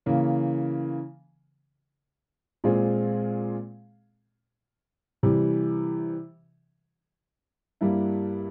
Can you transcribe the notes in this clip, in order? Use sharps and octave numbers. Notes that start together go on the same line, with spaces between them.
C#3 E3 A#3
A#2 G#3 C4 F4 G#4
C3 E3 G3
G2 G3 A#3 E4